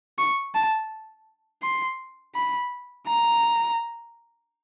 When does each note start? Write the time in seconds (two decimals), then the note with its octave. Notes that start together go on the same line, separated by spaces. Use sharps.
0.19 C#6
0.55 A5
1.63 C6
2.35 B5
3.08 A#5